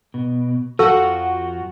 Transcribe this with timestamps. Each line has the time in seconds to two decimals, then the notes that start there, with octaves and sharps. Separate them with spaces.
0.14 B2
0.79 F2 F3 F4 F#4 A4 F#5